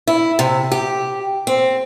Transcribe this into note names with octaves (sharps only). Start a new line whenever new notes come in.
E4
C3
G4
C4